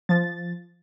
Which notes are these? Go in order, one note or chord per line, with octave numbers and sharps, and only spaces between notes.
F3 A6